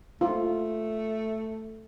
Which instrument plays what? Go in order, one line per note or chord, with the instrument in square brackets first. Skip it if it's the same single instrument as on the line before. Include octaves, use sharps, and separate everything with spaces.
[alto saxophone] A3 [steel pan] F4